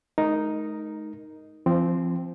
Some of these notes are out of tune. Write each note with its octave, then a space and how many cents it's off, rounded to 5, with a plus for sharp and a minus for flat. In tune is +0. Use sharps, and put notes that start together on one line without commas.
G#3 +40 D#4 +0 A#4 +0
F3 -30 C4 +0